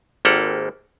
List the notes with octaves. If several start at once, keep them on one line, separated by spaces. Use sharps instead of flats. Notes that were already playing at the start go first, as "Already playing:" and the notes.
G#1 A#3 G4 A4 F#5